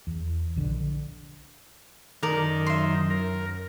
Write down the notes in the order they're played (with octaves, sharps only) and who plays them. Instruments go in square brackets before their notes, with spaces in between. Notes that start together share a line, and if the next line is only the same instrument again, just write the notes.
[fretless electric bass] E2
A#1 D3
[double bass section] F#2 [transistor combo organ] D#3 [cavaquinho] A#4 D5
[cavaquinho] E5 C6
[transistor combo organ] A#4